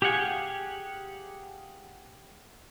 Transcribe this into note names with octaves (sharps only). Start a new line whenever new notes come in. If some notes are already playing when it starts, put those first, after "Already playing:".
G4 G#4 F5 F#5 G#5